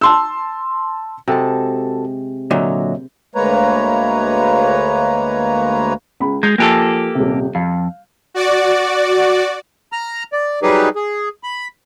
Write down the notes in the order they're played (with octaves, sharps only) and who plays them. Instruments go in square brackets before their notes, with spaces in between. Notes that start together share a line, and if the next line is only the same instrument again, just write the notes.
[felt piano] A5 C6 E6
[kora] C3 G#3 [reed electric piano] F#4 A4 A5
[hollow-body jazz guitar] A#2 D3 F#3 [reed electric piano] C#5 D#5 E5
[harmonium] D2 G#3 A#3 B4 C#5 A#5
[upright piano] C#2 B5
[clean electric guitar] G#3 [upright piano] G6 C7 F7
[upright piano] F3 G#5 F#6 [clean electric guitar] A#3 G4 A4
[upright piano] D#1 C3
[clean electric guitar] F2 [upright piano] F5
[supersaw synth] F#4 D5
[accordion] A#5 F6
D5
F#3 G3 D#4 G4 G#4 B4
G#4
B5